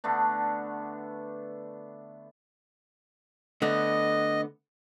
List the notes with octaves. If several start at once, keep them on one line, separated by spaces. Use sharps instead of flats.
D3 A3 B3 D4
D3 A3 B3 D#5